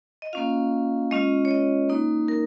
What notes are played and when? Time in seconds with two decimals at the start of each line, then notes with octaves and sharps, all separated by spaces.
0.22 D#5
0.33 A#3 C#4 F4 F5
1.11 G#3 C#4 F4 D#5
1.45 C#5
1.51 D#5
1.89 A#3 D#4
2.28 A#4